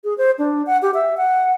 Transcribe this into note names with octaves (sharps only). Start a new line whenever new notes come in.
G#4
C5
D4
F#5
G4
E5
F#5